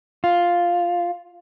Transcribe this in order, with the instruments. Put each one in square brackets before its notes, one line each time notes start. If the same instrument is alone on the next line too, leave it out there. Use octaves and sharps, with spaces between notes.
[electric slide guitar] F4